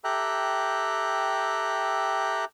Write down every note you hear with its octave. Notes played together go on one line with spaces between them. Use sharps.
G4 A4 E5 G5 A#5 F#6